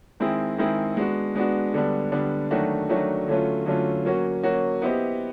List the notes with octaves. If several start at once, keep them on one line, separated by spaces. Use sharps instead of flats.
D#3 G#3 C4 E4 G#4
D#3 G#3 C4 E4 G#4
G#3 B3 D4 F#4
G#3 B3 D4 F#4
D3 G3 B3 D4
D3 G3 B3 D4
D#3 F#3 A3 D4 F#4
D#3 F#3 A3 D4 F#4
D3 F#3 A3 C#4 F4
D3 F#3 A3 C#4 F4
F#3 A#3 C#4 F#4
F#3 A#3 C#4 F#4
B3 E4 G4 C5 D#5